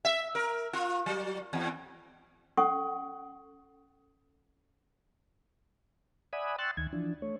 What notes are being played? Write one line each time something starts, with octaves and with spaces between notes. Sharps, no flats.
E5
A#4
F4
F#3
E2
C#4 A4 F#5 C#6
D5 E5 F#5 G#5 B5 D#6
G5 C6 C#6 E6 F#6 A6
D2 D#3 G#6
E3 F3 D4
A3 C#5